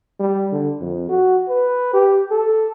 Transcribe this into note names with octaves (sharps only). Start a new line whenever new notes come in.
G3
D3
F2
F#4
B4
G4
A4